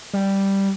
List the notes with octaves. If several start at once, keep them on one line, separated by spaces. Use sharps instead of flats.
G3